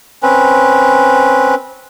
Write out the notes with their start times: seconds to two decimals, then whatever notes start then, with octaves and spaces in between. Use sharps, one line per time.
0.23 C4 C#4 B4